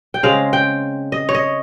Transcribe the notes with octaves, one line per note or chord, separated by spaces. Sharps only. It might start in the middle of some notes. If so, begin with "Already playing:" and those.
G5
C#3 G#3 C4 F5
G5
D#5
C#5
D#5